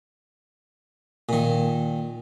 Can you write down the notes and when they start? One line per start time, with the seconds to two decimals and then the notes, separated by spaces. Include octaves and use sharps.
1.29 A#2 D#3